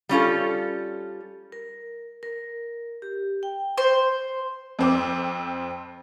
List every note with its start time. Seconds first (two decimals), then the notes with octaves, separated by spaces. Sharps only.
0.09 G3 C#4 F4 A4
1.52 A#4
2.23 A#4
3.02 G4
3.43 G5
3.78 C5
4.79 F2 C4 D6